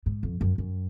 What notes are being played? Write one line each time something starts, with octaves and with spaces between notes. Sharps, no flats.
G#2
F2
F#2
F#2